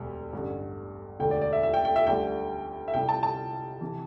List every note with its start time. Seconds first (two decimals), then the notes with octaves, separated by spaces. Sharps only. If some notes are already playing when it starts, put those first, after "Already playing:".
Already playing: E1 D2 G3
0.33 A1 G2 D3 A3
1.19 E1 D2 D3 G5
1.31 D5
1.41 D5
1.53 E5
1.63 E5
1.74 G5
1.85 G5
1.96 E5
2.07 D2 D3 G3 G5
2.88 E5
2.94 C2 C3 G3 G5
3.09 A5
3.23 A5
3.81 C3 E3